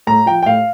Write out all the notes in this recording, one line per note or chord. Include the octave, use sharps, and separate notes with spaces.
A2 A#5
F3 G5
G5
A2 F5